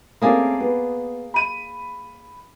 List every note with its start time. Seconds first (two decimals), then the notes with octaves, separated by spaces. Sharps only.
0.22 A3 A#3 C4 C#4 G#4 D5
0.60 B3
1.34 B5 D#7